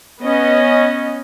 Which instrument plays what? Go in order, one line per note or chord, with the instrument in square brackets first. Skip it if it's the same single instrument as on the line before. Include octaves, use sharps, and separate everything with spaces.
[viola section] B3 C#4 D#5